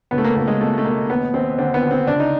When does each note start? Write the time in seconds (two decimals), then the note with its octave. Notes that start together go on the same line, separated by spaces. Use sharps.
0.11 C#2 B3
0.18 A3
0.24 A#3
0.36 C#2 A#3
0.48 G#3
0.61 B2 A3
0.78 A3
0.84 B2 A#3
1.10 D#2 B3
1.34 D#2 C4
1.58 D3 C4
1.74 B3
1.83 D3
1.91 C4
2.07 C#2 D4
2.20 D#4